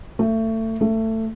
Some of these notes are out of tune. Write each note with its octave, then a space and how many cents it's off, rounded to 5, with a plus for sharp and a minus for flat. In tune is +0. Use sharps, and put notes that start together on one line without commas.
A3 +25
A3 +20